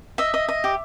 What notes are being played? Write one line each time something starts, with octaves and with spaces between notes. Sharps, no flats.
D#5 E5
D#5
D#5
G4